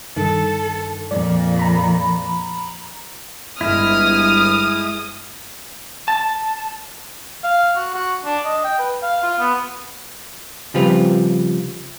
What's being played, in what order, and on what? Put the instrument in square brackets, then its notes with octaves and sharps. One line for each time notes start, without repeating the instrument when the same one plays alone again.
[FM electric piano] G2 D3 D#3 [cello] A4
[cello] F2 A#2 [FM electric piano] D5
[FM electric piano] A#5 B5
[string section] G1 F6 [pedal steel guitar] G#3 E4 [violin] D#6
[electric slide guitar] A5
[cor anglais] F5
F#4
F#4
D4
D#5
G5
B4
F5
F4
B3
[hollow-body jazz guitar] C#3 F3 G3 C4 F4 B4